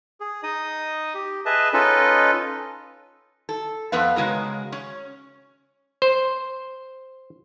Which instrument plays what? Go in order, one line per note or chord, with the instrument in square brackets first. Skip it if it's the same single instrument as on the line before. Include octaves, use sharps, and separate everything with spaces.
[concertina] G#4
D#4 D#5 D#6
G4
G#4 B4 D#5 E5 A5
C#4 D#4 F4 A4 B4 D#5
[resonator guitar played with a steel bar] A4
F2 F3 B3 B4 F5
C#3 G#3 F#4 A#4
C#4
[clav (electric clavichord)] C5